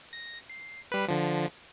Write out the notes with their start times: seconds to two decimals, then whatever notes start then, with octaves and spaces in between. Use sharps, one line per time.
0.13 A#6
0.50 C7
0.92 G3 B4
1.08 D3 F3